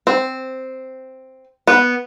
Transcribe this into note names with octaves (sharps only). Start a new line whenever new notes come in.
C4
B3